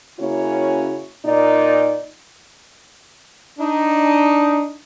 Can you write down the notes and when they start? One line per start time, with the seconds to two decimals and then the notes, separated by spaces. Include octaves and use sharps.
0.20 C#3 A#3 C#4 E4 F#4 C#5
1.25 A#2 D#4 D5
3.59 D4 D#4